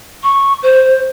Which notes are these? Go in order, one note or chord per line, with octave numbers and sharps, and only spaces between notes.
C#6
C5